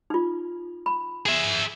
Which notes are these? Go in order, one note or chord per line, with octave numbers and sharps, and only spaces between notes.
D#4 F4
B5
G#4 E5